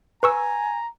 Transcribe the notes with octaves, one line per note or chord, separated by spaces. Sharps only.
B4 G#5 A#5 C#6 E6